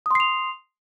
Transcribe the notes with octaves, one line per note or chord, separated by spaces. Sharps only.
C6 D#6 C7 F7